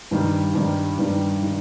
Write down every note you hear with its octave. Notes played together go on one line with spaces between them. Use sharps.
G2 D#3 G3
G2 D#3 G3
G2 D#3 G3
D#3 G3